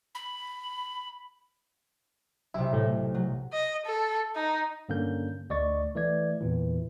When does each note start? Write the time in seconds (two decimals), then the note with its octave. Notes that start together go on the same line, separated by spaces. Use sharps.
0.15 B5
2.54 B1 C3 E4
2.73 A2 A3
3.14 F#3
3.53 D#5
3.86 A4
4.35 D#4
4.89 G2 D3 A#3 C#4 G6
5.50 D2 D5 D#5 C#6 A6
5.95 E3 A3 D5 G#6
6.40 E2 A#2 E3